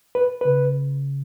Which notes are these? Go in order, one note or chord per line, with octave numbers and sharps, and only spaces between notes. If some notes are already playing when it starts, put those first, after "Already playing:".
B4
C#3 B4